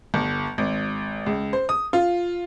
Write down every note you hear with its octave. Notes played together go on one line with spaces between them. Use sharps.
G1
G#1
C#2
C5
D#6
F4